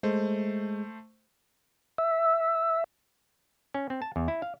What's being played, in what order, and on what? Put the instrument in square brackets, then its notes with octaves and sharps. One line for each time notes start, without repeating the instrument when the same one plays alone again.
[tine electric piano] G#3 [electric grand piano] A3 C5
[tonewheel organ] E5
[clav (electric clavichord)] C#4
C4
A5
E2
E4
F5